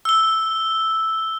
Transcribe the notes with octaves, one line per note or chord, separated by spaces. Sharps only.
E6 G7